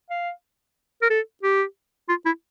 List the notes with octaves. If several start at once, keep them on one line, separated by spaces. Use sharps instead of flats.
F5
A#4
A4
G4
F4
E4